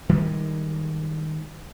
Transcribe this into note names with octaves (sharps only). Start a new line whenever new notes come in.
D#3 G3 G#3